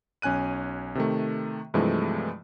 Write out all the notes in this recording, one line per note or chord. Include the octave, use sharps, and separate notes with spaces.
B1 C#4 G#5 F#6 D#7
C3 D#3 A3
G2 C3 E3 F3 G#3 A3